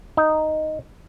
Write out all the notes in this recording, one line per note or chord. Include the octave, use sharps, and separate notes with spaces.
D#4